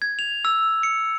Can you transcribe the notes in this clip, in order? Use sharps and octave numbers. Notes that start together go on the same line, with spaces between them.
G#6
F7
E6
C#7